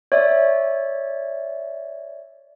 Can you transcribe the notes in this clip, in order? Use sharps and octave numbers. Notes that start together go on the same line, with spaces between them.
C#5 D5 E5